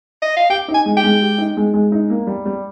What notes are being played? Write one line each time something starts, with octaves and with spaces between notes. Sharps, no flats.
D#5
F5
G4 G5
D#4
G#5
G#3
G5
G#3
G4
D#4
G#3
G#3
D#4
A#3
G3
G3